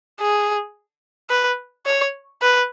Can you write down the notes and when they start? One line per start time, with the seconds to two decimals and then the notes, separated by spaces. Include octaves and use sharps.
0.20 G#4
1.30 B4
1.87 C#5
2.42 B4